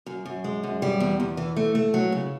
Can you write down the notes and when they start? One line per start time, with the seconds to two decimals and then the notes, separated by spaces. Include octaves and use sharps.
0.06 F#2
0.25 F#2
0.44 G#3
0.63 F#2
0.82 G3
1.00 E2
1.20 E2
1.37 E3
1.56 A3
1.75 A3
1.94 F#3
2.12 C#3